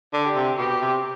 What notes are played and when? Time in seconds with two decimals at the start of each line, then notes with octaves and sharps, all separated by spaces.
0.13 D3
0.25 G4
0.36 C3
0.58 B2 G4
0.81 C3